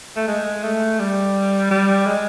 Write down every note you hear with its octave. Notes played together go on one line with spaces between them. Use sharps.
A3
G#3
A3
G3
G3
G#3